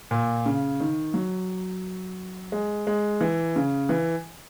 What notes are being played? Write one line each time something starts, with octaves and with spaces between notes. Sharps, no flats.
A#2
C#3
D#3
F#3
G#3
G#3
E3
C#3
E3